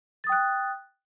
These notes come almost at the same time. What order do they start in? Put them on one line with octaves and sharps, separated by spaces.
A6 D#6 G5 F#6